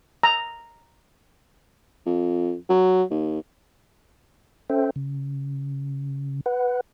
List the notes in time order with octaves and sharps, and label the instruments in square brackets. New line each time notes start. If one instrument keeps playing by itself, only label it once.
[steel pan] A#5
[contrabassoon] F2
F#3
D#2
[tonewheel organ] C#4 A4 C5 E5 G5
C#3
B4 F#5